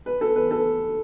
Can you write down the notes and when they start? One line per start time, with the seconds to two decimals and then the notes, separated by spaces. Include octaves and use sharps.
0.06 B4
0.21 A4
0.36 B4
0.51 A4